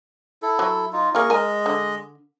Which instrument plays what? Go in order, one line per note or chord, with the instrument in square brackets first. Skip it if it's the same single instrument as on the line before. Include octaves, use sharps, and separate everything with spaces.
[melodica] E4 A4
[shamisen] F#3
[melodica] D#4 F4
[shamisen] A#3 F4 [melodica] G#4 A#4 C#6
[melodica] G#3 D#5 [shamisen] A#4 G#5
[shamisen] D3